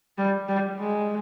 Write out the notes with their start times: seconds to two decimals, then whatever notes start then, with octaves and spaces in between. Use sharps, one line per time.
0.18 G3
0.49 G3
0.79 G#3